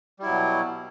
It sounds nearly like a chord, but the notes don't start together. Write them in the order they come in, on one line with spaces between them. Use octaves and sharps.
G3 E4 F#3 B2